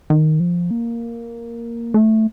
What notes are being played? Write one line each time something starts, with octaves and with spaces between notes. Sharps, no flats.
D#3
F3
A#3
A3